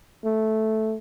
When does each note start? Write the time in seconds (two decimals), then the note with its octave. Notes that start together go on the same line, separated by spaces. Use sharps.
0.24 A3